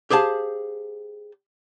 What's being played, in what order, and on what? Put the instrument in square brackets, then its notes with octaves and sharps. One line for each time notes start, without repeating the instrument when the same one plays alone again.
[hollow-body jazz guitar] G4 G#4 C5 F5 A5